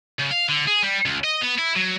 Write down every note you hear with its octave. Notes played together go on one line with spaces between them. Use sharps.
C#3
F5
D3
G#4
G3
C#2
D#5
B3
E4
F#3